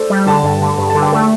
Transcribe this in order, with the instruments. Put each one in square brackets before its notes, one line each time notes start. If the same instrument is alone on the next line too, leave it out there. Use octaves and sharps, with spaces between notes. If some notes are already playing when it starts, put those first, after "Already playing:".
Already playing: [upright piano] A4 C5 D5
[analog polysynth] G3
[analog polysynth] D3 [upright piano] A5
[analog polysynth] G2
D3
G2
[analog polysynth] D3 [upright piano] A5
[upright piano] G5
[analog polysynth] A3 [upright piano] A5